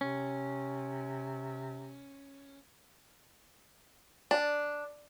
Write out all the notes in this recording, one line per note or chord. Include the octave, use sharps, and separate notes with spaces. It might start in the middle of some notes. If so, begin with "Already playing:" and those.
C3 C#4
D4